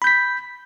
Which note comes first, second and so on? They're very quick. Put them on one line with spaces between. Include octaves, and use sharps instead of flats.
B5 G6 B6